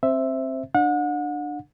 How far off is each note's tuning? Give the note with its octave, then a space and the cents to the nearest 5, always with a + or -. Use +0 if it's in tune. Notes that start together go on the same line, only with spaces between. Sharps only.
C4 +20 C5 +0 E5 +0
D4 +20 F#5 -35